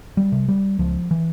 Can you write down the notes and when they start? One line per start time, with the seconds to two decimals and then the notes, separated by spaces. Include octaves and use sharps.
0.17 G3
0.32 C3
0.48 G3
0.79 C#2 F3
1.11 E3